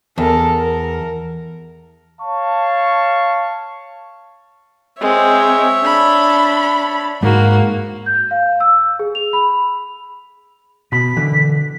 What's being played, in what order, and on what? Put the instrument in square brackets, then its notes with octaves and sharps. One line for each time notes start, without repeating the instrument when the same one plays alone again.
[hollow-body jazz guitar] E2 [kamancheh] A4 A#4
[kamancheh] A#4
[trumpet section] C#5 F5 A5 C#6
[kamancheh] G#3 C4 [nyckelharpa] C#5 E5
[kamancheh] D4 B5
[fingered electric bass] G#2 G#3 [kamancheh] A#3 [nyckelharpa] F#4
[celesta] G6
F5
E6
G#4
F7
B5
[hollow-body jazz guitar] B2 B5 [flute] B6
[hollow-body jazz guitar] D3 E3